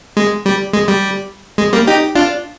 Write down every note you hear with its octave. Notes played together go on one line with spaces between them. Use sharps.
G#3
G3
G#3
G3
G#3
G3 A#3
D#4 G4
D4 F4